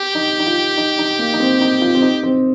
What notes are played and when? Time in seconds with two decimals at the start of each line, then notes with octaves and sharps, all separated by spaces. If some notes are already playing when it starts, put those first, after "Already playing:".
Already playing: G4
0.15 D#4
0.39 D#4
0.47 F4
0.77 D#4
0.99 D#4
1.19 A#3
1.33 D#4
1.40 C4
1.61 D#4
1.82 F4
1.95 C4
2.02 D#4
2.23 C4